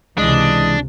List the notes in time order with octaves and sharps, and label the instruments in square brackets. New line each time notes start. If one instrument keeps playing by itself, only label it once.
[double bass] C#2 C3 [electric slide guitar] E3 G#3 [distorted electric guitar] D4 [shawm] D#5